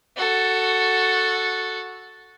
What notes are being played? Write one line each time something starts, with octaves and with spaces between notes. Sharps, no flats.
F#4 A4